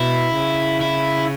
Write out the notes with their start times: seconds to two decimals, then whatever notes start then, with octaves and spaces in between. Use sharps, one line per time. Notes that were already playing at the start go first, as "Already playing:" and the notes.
Already playing: B2 E4
0.36 C#3
0.81 E4